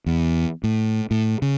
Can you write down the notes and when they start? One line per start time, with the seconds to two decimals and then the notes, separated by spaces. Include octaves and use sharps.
0.06 E2
0.64 A2
1.11 A2
1.42 C#3